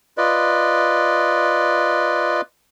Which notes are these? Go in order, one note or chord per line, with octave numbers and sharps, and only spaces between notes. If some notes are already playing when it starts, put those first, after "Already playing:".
F4 B4 D5 D#5